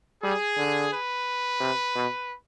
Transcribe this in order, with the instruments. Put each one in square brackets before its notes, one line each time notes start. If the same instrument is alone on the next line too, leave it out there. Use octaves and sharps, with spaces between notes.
[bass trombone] G3 [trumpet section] G#4
[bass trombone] D3
[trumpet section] B4
[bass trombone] C3
B2